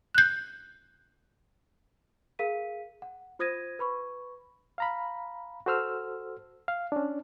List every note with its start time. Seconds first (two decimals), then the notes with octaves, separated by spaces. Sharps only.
0.15 F#6 G6
2.39 G#4 A#4 F5 B6 D#7
3.02 F#5
3.39 F4 C5 D#6 G#6 A#6 D#7
3.79 B4 B5 C#6
4.78 F5 A#5 B5
5.66 F#4 A4 C5 E6 F6
6.68 F5
6.92 C#4 D4